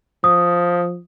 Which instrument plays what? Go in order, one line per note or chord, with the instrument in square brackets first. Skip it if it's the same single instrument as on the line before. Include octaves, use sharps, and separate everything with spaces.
[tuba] F3 [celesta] D#6